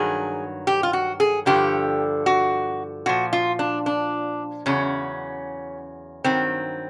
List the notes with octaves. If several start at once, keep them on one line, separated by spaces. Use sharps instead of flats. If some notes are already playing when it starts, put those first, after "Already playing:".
Already playing: G2 D#3 F#3 G#4
G4
F4
F#4
G#4
G2 D3 F3 G4
F#4
A#2 F3 F#4
F4
D4
D4
E2 C#3 F#3 C#4
G2 D#3 F#3 C4